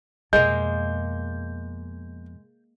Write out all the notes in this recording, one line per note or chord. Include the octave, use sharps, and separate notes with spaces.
F2 B2 G#3 A#3 D#5 G6